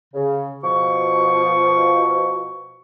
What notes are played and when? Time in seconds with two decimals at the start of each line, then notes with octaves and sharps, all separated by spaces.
0.14 C#3
0.64 B2 F3 C#6